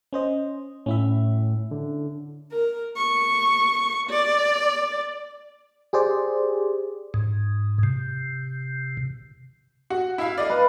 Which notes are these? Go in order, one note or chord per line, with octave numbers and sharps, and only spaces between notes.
C#4 C5 D#5
A2 C#4 E4 E5
D3
A#4
C#6
D5
G4 G#4 C5 D5
G#2
C3
F#4
E4 E5 F5
D5 D#5 F5
B4